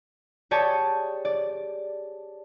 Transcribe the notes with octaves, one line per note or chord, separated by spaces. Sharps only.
G4 G#4 C#5 D5 A5
D5